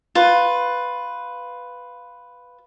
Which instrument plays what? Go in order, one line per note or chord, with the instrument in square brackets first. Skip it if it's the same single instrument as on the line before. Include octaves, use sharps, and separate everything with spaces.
[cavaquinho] F4 B4